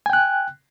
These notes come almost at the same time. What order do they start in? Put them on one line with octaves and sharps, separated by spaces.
G#5 G5 F#6